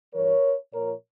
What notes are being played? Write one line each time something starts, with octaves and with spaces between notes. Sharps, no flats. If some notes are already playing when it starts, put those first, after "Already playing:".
G2 E3 G3 A#4 C#5
A#2 F3 A#4 C#5